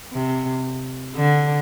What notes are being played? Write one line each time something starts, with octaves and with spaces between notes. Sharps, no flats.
C3
D3